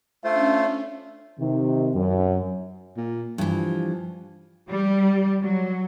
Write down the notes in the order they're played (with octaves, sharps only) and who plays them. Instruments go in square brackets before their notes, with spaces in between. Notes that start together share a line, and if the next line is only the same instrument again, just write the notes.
[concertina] A3 F4 C5 [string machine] C#4 D4 [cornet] E5
[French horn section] C3 D#3
F#2
[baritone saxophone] A#2
[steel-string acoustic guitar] G2 E3 [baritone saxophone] F3
[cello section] G3
F#3